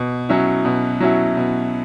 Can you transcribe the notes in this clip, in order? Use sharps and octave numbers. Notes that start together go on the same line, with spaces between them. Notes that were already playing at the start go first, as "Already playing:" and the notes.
Already playing: B2
F#3 C#4 E4
B2
F#3 C#4 E4
B2